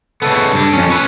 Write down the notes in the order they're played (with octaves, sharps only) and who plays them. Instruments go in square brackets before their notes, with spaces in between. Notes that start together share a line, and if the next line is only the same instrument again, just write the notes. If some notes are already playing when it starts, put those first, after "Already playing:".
[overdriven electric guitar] C#3 B3 [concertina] A4
[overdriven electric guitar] G2 D4
F2 C#4
C#4 B4